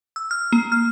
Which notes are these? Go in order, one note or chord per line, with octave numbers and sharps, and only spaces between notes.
E6
F6
A#3
F6